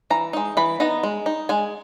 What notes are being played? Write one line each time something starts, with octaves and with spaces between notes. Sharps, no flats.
E3 A#5
G#3 D#4
E3 B5
B3 D#4 A#5
G#3
D#4
G#3 G#5